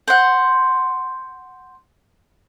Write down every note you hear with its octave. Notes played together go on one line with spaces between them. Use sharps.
C5 F#5